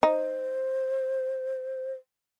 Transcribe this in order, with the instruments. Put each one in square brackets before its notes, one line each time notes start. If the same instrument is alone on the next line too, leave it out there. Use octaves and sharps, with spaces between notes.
[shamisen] D#4 [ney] C5